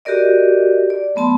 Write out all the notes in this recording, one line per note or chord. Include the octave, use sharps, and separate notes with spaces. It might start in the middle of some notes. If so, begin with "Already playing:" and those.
F#4 G4 A4 A#4 D5 D#5
D5
F#3 A3 B3 A5 C6